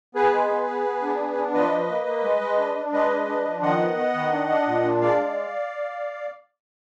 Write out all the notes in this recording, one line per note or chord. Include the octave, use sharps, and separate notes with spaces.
B3 G#4 B4
G#3
B3
B3
B3
D4
B3
D4
F3 B4 D#5
F3
A#3
A#3
G#3
G#3
D4
D4
G#3 B4 D#5
D4
D4
F3
D#3 D#5 F#5
B3
B3
D#3
D4
D4
A#2
D4
G#3 D5 F5
G#3